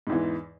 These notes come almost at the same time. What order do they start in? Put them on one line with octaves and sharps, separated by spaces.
G#2 E2 E3